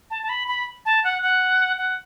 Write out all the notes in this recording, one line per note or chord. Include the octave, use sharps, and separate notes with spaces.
A5
A5
B5
B5
A5
F#5
F#5
F#5